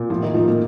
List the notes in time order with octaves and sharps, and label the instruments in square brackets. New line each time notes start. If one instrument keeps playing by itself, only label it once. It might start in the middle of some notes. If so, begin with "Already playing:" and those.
Already playing: [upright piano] A#2
[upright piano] A2 [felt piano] F3
[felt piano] D#3
[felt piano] F3 [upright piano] D#4
[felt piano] A#3